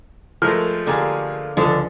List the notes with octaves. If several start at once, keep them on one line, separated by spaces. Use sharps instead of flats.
F3 G#3 A3 A#4 F6
D3 A#3 G4 G#4
C#2 D3 F3 A4 D#6